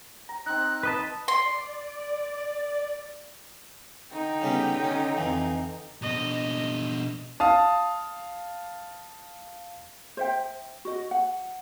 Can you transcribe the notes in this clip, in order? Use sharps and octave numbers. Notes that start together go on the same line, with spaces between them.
A#5
C4 D#4 F#6
B4 D#5 A5
D5 C6
D3 D#4 G5
C#3 G3 B3
C#4
F2 E3
B2 D4 D#5
F5 A5 D#6
C5 E5 G5
F#4 D#5
F#5